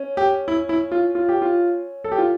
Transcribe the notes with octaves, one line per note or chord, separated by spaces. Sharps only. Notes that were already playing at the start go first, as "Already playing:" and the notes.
Already playing: C#4
G4
E4
E4
F4
F4
G4
F4
A4
G4
F4